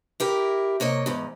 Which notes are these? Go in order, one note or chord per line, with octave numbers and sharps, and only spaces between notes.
E4 G4 A#4
C3 A#3 C#5 D#5
E2 G#2